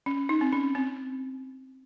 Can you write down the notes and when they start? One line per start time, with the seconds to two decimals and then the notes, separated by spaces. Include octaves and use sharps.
0.06 C#4
0.29 D#4
0.41 C4
0.52 C#4
0.75 C4